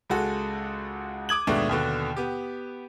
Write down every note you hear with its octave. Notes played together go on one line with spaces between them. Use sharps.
C#2 G#3 F#4 A4
D6 D#6 G#6 F#7
D#2 G#2 B2 A3 D4
D#2 B2 D3
B3 G4